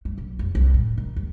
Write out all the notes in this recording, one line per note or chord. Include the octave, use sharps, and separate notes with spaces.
A3
B1
F1
C2
A2
D#3
D#2